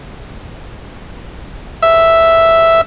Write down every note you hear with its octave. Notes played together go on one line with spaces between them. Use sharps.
E5